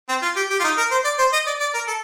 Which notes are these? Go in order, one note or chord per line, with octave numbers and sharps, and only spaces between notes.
C4
F4
G4
G4
F4
D#4
A#4
C5
D5
C5
D#5
D5
D5
A#4
A4